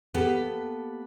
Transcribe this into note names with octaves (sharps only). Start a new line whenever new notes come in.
A#3 B3 G4 A4 B4